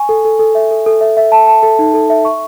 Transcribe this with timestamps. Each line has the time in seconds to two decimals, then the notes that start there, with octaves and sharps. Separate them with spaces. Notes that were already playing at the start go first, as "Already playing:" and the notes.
Already playing: G#5 C#6
0.09 A4
0.25 A4
0.39 A4
0.55 E5
0.71 A4
0.86 A4
1.01 E5
1.17 E5
1.32 A5
1.47 A5
1.63 A4
1.79 D#4
1.94 A4
2.10 E5
2.25 C#6